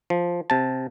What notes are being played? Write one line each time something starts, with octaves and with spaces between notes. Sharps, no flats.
F3
C3 A5